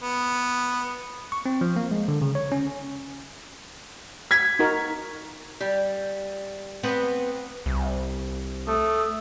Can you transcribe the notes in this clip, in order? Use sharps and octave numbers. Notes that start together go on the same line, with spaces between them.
B3
C#6
C4
F3
A#3
G#3
D3
C#3
C#5
C#4
G#6 B6
D#4 F#4 A#4
G3
B3 C4 B4
C2
A3 D#6